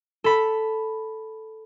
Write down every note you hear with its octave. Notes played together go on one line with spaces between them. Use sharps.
A4 B5